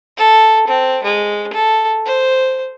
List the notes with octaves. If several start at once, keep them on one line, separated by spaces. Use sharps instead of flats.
A4
C4
G#3
A4
C5